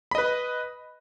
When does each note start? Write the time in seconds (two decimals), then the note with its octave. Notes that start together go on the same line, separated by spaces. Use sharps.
0.11 B5
0.15 D#5
0.18 B4